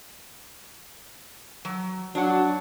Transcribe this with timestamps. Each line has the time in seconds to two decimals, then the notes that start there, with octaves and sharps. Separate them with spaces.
1.65 F#3
2.15 F#3 D4 F#5